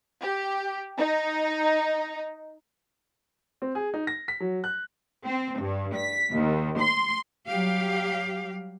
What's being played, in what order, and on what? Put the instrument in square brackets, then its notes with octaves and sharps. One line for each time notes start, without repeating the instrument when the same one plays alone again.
[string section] G4
D#4
[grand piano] C4
G#4
D#4
A#6
B6
F#3
F#6
[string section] C4
G2
B6
D#2
C6
[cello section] F#3 G3 G4 F5